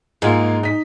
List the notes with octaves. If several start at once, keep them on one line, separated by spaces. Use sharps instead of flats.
G#2 A#3 F4 G#4
D#4 B6